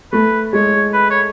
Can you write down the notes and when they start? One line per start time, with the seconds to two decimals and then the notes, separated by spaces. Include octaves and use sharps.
0.12 A3 B4
0.53 G#3 C#5
0.93 B4
1.10 C#5